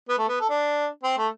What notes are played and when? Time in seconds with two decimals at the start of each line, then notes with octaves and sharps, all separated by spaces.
0.09 B3
0.18 A3
0.29 B3
0.40 A4
0.50 D4
1.03 C4
1.18 A3